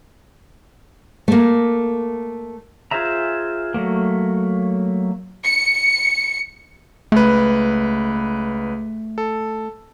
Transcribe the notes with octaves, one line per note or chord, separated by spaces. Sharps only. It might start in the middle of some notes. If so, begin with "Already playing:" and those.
A3 A#3
F4 G#4 C5 E5 A#5
F#3 A3 A#3
C#7
C#2 A3 B4
A4